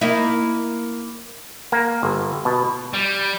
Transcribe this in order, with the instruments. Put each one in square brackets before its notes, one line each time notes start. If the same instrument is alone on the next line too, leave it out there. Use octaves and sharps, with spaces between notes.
[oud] A#3 D#4 E4
[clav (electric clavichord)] A#3
G1
B2
[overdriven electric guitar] G3